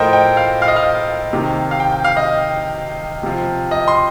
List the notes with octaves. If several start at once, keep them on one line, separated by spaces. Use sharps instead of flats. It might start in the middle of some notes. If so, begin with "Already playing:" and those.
Already playing: A2 F3 A4 A#4 C5 D#5 G5
G5
F5
F5
D#5
F5
C3 D#3
F5
G5
G5
F5
D#5
C3 F3
D#5
C6